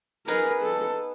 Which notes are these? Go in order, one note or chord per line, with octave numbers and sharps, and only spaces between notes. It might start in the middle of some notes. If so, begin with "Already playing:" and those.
B3 D#4 G#4 A#4 B4
A4